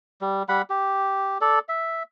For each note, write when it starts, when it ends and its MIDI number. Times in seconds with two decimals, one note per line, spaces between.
0.21 0.43 55
0.49 0.62 55
0.49 0.62 78
0.49 0.62 83
0.70 1.38 67
1.41 1.59 69
1.41 1.59 74
1.69 2.03 76